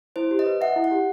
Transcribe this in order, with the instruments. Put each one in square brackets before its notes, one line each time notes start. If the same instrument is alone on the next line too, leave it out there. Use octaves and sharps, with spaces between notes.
[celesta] E4 [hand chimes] C5
[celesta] G4
[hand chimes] D#5
[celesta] B4
[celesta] E5 [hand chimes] F#5
[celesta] E4
[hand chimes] F#5
[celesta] G4